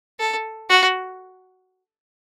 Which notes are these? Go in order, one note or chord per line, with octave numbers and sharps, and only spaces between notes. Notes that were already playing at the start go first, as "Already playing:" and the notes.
A4
F#4